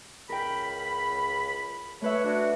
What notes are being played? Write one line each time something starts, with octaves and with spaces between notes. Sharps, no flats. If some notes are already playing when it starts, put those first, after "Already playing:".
C#2 A#4 G5 B5
A3 B4 C#5 E5
D4 F#4